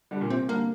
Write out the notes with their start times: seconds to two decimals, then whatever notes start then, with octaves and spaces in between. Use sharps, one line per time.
0.11 D3 G3
0.21 A#2
0.30 C3 C4
0.49 D3 G3 A#3